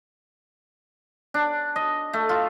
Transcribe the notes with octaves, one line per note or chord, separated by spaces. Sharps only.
D4
D#5
A3
F4